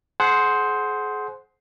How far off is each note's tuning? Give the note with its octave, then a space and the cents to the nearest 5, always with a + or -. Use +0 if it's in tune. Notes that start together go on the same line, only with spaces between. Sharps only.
G#4 +30 C5 +0 F#5 +0